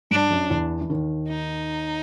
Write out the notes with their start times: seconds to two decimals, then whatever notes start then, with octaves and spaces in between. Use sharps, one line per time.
0.11 G2 G3 D4
0.30 F#2 F#3
0.50 E2 E3
0.81 E3
0.90 D#2 D#3
1.29 D#4